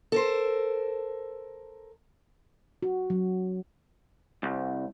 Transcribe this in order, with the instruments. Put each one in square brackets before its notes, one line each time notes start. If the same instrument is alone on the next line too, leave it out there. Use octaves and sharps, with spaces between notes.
[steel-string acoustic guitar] A4 A#4 C5
[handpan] F#4
F#3
[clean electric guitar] C2